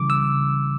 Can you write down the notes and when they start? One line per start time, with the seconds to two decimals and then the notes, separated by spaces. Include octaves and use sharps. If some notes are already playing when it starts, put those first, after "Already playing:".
Already playing: C#3 E3 G3 D6
0.10 E6